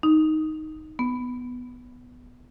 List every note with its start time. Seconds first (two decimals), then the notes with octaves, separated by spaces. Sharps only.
0.03 D#4
0.99 B3